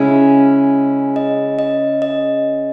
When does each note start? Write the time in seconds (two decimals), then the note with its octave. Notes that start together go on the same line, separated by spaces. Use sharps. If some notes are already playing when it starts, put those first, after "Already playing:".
Already playing: C#3 G#3 C#4 E4 D#5
1.16 D#5
1.59 D#5
2.02 D#5